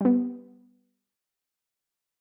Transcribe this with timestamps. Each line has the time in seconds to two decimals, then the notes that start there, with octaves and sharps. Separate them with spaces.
0.01 G3 B3